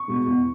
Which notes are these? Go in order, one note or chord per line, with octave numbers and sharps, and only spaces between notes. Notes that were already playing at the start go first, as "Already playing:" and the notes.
Already playing: C#6
B2 G#3 B3
E2